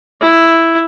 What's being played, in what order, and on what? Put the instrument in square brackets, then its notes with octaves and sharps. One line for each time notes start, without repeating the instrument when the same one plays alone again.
[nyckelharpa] E4